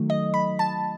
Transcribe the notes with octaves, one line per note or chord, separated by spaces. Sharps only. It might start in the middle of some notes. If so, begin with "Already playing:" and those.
Already playing: D#3 F#3 A3
D#5
B5
A5